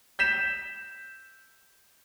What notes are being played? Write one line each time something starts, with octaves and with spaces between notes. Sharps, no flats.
G6 B6 E7